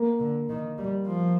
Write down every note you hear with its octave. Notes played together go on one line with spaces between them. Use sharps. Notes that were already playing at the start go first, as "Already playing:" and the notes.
Already playing: A#3
D3
D#3
G3
F3